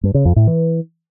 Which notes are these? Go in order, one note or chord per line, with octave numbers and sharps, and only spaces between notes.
G2
C#3
F2
A2
E3